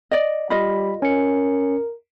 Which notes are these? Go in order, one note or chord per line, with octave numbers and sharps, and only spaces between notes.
D5 D#5
G3 F4 D#5 B5
C#4 A#4 C#7